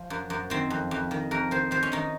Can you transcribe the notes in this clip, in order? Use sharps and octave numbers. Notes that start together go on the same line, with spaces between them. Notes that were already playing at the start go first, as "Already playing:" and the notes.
Already playing: F3
F#2
F#2
D#3 C4
F2
F2
D#3
F2 A#4
D#3 C5
D#3 C5
C#4
D#3 D#4